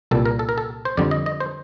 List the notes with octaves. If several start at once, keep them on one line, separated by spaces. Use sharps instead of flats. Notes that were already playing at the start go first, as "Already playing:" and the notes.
C2 A#2 G3 A4
A#4
A4
A#4
A4
C5
F2 D3 G3 D5
D#5
D#5
C5